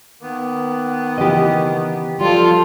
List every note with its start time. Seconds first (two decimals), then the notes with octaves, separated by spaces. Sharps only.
0.21 D#3 A#3 B3
1.18 C#3 E3 E4 G4 D#5
2.21 F3 G3 F4 A4